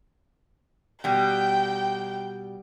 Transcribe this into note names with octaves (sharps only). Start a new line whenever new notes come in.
B2 G3 G5